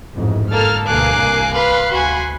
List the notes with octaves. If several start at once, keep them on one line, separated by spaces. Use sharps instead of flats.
A1 F2 G#2
G1 A#3 A4 F6 A6
D2 G2 B2 A#3 G#5 D6 F#6 C7
C2
B4 F5 B5 C6 F#6
D2 F#4 G#5